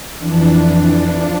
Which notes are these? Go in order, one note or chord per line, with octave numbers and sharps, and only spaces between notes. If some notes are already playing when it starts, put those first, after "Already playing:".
F2 E3 D4
F3